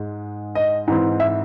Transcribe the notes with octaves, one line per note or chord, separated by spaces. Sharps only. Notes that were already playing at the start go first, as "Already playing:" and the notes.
Already playing: G#2 G#3
D#5
G#2 E3 C4
E5